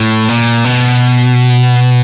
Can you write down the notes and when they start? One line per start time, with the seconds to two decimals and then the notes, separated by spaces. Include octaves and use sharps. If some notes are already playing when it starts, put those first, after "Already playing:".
Already playing: A2
0.28 A#2
0.64 B2